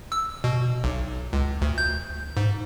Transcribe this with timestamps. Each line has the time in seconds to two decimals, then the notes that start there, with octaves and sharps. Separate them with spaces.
0.12 E6
0.44 B2
0.84 B1
1.33 C#2
1.62 D2
1.78 G6
2.37 G#2